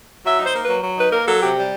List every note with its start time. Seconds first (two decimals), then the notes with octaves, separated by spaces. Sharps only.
0.24 F#3 E5
0.39 D#4 C5
0.54 A#3
0.64 F#3 B4
0.83 F#3
0.98 D#4 B4
1.12 A#3 A#4
1.27 F#3 A4
1.41 C3 G4
1.56 G3